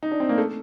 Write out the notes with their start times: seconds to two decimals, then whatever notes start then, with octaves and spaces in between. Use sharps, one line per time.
0.03 D#4
0.12 D4
0.20 C4
0.29 A#3
0.38 A3